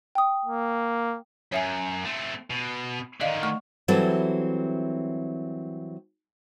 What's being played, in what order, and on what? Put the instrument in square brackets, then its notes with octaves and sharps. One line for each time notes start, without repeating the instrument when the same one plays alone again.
[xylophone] G5 D#6
[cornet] A#3
[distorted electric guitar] F#2 [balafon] C#5 E5 G#5
[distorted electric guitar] A3 C4
B2
[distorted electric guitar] D3 D#3 [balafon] D5 D#5 F5
[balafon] A3 F#5 C#6
[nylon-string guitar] E3 F#3 G3 C4 E4 A4